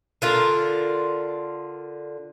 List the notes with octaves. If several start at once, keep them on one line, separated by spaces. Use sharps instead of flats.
D3 F4 A#4